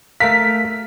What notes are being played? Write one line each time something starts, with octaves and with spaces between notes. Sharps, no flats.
A3 A#4 F5 B6